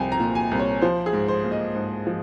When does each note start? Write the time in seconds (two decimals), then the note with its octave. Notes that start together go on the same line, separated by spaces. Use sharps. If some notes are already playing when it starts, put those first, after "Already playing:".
Already playing: C2 F3 G5 G#5
0.12 A#5
0.20 A#2
0.35 G#5
0.51 C2
0.59 C#5
0.82 F3 C5
1.06 G#4
1.13 G#2
1.28 C5
1.44 A#3
1.52 D#5
1.75 G#2
2.07 F3